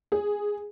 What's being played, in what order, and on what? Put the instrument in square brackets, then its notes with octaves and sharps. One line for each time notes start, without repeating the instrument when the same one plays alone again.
[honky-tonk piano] G#4